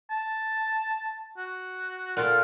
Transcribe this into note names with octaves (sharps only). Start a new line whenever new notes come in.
A5
F#4
A#2 F4 A4 F#5